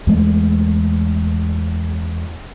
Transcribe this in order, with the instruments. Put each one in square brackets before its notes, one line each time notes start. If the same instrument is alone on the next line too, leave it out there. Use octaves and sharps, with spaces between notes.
[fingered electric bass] E2 G#3 A3